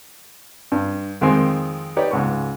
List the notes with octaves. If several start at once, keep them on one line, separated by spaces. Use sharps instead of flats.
G2
F2 D#3 G#3 C4 G#5 C6
D#4 G4 B4 C#5 D5
C#2 G#2 C#6